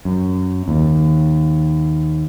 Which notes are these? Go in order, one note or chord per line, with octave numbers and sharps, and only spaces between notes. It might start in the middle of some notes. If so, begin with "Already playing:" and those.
F#2
D#2